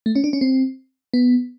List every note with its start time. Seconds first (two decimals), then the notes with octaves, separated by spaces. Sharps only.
0.06 A3
0.15 C#4
0.24 D4
0.33 C#4
0.41 C4
1.14 B3